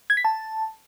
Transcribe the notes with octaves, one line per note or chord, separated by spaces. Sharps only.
G#6
B6
A5